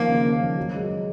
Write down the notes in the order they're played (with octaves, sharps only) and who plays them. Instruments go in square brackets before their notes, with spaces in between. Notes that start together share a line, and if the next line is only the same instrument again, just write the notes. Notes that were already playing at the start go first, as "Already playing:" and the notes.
Already playing: [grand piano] D#3 F3 [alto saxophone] A#3
[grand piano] C#3
D#3
F3
F#3
G#3